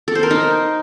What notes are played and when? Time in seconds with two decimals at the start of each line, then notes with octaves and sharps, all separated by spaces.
0.08 A4
0.15 C5
0.23 A#4
0.31 D#4